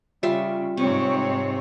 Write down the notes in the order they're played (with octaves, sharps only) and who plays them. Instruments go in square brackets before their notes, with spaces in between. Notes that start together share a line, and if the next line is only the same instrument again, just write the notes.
[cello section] C#3 [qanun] G3 F4 E5
[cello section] G#2 C4 C#5 [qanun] C3